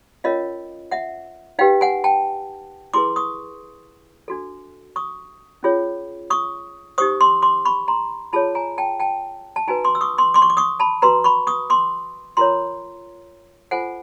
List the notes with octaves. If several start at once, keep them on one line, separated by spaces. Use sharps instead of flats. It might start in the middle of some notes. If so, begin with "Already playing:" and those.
C#4 F4 A#4 C#5 D#5 F5
E5 F#5
D#4 G4 B4 F5 G5
F#5 G#5
G5 A5
E4 G#4 B4 C6 D6
C#6 D#6
D4 F#4 A4
C#6 D#6
C#4 F4 G#4 C#5
C#6 D#6
D#4 G4 C5 C#6 D#6
C6 D6
C6 D6
B5 C#6
A#5 C6
F4 G#4 C#5 A5 B5
G#5 A#5
G5 A5
G5 A5
A5
D#4 F#4 B4 G#5 A#5
C6 D6
E6
C#6 D#6
C6 D6
C6 D6
C#6
D6
C#6 D#6
A5 B5
F#4 B4 A#5 C6
B5 C#6
C#6 D#6
C6 D6
F4 A#4 C#5 A#5 C6
F4 A4 C5 F#5 G#5